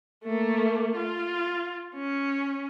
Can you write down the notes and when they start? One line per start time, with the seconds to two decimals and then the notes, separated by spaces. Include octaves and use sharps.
0.24 A3 A#3
0.96 F4
1.95 C#4